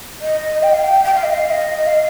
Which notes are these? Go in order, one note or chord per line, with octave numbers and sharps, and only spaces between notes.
D#5
G5
F5
G5
G5
F5
D#5
F5
F5
D#5
F5